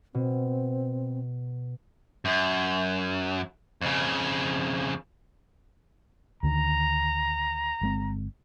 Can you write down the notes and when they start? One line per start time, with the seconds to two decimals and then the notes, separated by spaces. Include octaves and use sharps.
0.14 B2 C4
2.25 F#2
3.81 F2 C#3
6.43 D2 D3 D#3 A#5
7.81 G1 G#3 C4